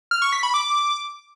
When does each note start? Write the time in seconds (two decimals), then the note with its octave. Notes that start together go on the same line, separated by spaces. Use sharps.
0.11 F6
0.22 C#6
0.32 B6
0.43 B5
0.54 D6